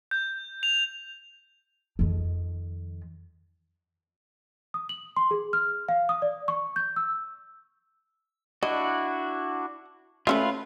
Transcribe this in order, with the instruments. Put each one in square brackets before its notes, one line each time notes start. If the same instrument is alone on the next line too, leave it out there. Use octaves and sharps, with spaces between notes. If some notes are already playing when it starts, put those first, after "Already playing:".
[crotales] G6
F7
[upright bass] F2 D#3
[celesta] D#6
F#7
C6
G#4
F6
F5
D#6
D5
C#6
G6
E6
[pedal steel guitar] D4 E4 F#4 [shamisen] D#5
[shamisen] A3 C#4 E5 [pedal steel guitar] F4 B4